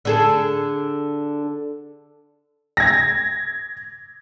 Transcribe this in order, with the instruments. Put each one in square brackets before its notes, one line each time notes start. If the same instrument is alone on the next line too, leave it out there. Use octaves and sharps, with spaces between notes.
[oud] D3 G#4 A4
[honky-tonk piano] G#6 A#6